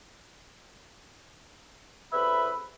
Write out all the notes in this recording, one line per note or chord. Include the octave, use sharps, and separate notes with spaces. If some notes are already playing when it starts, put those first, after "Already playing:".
E2 C3 A4 B4 E5 B5